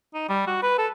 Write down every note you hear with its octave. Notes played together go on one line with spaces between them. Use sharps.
D#4
G3
F#4
B4
A4